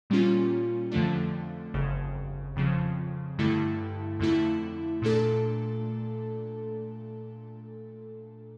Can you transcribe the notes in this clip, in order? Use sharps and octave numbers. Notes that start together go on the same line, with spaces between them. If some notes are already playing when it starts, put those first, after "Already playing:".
A#2 G3 A#3 C#4 F4
F2 D3 F3 A3 D4
G1 F2 C#3
F2 C#3 F3
G2 D3 A3 E4
F2 D3 A3 E4
A#2 A3 D4 A4